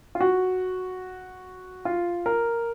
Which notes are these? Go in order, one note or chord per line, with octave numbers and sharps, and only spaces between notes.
F4
F#4
F4
A#4